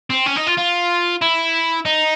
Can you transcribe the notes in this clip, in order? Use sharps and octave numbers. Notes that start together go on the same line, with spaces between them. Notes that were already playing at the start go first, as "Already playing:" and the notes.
C4
C#4
D#4
F4
F4
E4
D#4